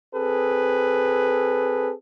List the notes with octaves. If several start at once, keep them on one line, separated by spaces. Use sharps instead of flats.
C4 G#4 A4 B4